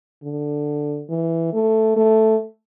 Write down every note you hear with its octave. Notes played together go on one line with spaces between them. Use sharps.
D3
E3
A3
A3